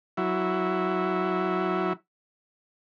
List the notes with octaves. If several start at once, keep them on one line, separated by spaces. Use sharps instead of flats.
F#3 E4